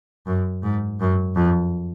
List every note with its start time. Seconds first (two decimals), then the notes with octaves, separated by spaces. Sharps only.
0.27 F#2
0.63 G#2
1.00 F#2
1.36 F2